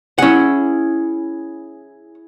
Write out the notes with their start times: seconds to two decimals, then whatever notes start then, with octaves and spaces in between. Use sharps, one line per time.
0.18 C#4 E4 G#4 F#5